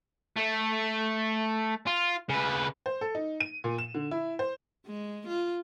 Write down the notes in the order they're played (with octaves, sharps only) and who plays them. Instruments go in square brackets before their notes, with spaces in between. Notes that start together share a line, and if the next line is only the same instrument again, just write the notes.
[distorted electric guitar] A3
F4
C#3 B4
[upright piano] C5
A4
D#4
D#7
A#2
E7
D3
E4
C5
[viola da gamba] G#3
F4